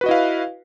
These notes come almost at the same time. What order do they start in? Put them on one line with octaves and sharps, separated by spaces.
B4 F#4 D#5 E4 F5